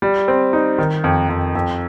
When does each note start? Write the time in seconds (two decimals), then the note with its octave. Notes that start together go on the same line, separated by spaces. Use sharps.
0.02 G3
0.28 C4
0.53 D#4
0.78 D#3
1.04 F2
1.29 F2
1.55 F2